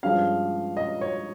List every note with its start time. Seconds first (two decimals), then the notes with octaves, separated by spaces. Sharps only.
0.03 G2 F3 G#3 C#4 F5
0.77 D#5
1.01 C#5